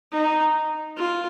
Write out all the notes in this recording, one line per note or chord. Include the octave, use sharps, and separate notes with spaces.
D#4
F4